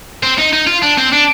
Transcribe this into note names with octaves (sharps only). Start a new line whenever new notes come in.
C4
D#4
D#4
F4
D4
C4
D4